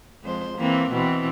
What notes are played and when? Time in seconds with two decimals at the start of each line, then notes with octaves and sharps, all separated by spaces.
0.23 F2 G#3 C5
0.57 E3 A#3 C4
0.91 B2 E3 C4